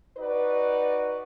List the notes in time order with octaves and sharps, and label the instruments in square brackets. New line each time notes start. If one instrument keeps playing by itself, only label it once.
[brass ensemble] D#4 F#4 B4 D5